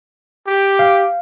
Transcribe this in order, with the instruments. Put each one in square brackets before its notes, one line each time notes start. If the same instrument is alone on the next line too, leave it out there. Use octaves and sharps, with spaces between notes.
[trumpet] G4
[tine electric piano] F5